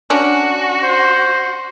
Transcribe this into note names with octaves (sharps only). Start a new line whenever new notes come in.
C#4 D4 F#4
C5